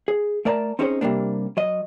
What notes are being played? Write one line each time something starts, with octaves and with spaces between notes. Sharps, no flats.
G#4
A3 A#4 D5 A5 A#5
C4 C#4 D#4 G#4 C5 C#5
C3 D#3 G3 A#3 D4
F#3 D#5